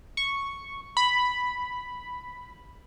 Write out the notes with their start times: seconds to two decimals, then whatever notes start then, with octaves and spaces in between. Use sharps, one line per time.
0.17 C#6
0.97 B5